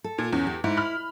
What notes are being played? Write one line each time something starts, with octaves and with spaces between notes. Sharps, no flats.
A4
A#2
E2 C#4
G4
G#2 E4
B5 F6